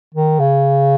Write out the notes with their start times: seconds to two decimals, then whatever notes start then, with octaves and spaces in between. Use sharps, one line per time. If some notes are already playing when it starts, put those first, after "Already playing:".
0.15 D#3
0.40 C#3